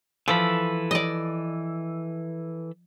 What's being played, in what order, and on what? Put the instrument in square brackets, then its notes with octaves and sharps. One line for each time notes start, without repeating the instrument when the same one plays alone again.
[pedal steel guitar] E3 A4 B5 [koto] F3
[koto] D5 D#5